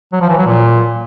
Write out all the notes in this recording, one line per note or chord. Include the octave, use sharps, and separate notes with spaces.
F#3
F3
E3
F#3
A#2